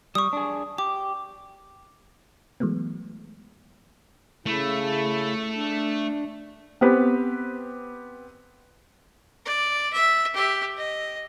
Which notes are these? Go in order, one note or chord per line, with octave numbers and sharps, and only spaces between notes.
G3 C#6 D#6
D4 G#4
G4 D6
E3 F#3 G#3 A3 B3
C#3 A3 E4
D4
B3 C4 G4 B4
D5
E5
G4 E5
D#5